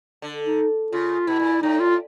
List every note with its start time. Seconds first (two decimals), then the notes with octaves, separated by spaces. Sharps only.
0.22 D3
0.46 D#4
0.92 C#3 F4
1.27 B2 E4
1.40 A#2
1.62 A2 D#4
1.80 F4